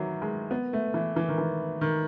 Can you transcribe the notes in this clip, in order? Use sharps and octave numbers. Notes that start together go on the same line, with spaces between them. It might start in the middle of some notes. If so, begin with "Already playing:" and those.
Already playing: D#3 E3 F#3
G#3
B3
A3
E3
E3
D#3
E3
D#3